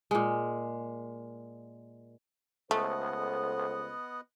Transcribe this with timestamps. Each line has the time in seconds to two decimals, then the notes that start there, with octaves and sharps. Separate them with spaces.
0.11 A#2 G#3
2.71 C#2 A3 B3 A4 C5 D#5 F#5